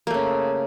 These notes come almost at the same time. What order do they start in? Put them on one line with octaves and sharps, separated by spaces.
A#3 A3 C#3